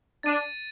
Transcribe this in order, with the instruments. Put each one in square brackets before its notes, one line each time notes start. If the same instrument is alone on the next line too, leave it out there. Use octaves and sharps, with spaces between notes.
[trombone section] D4 [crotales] A6 D#7